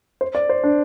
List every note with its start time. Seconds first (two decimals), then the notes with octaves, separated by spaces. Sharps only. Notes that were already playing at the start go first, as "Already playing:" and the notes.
0.21 C5
0.35 D5
0.49 C5
0.64 D4